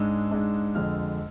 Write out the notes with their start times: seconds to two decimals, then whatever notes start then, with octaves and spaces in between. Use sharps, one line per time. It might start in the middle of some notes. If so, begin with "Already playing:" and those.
Already playing: G#2 G#3 D4 E6
0.31 G#2 G#3 D4
0.75 F2 D3 G#3 F6